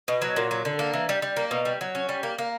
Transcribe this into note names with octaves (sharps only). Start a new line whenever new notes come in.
B2
F#3
A#2
F#3
D3
A#3
E3
G3
G3
A#3
B2
G3
F#3
C#4
G3
A#3
A#3